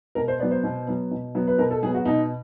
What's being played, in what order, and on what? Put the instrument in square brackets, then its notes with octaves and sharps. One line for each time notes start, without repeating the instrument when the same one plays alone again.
[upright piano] B2 A#4
C5
B3 D5
F#3
C5
B2
F#3 B3
B2
F#3 B3
B4
B2 A#4
A4
F#3 B3 G#4
F#4
B2 D#4